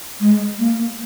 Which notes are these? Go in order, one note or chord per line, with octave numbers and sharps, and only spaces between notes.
G#3
A#3